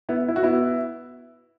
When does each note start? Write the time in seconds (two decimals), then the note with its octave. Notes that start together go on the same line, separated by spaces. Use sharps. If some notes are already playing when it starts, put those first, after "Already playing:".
0.09 B3 E4
0.28 E4
0.36 F#4
0.43 B3 E4